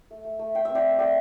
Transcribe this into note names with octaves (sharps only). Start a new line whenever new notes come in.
A3
A3
A3
A3 G5
C4 E5
D5 G5
A3
A3 D5 G5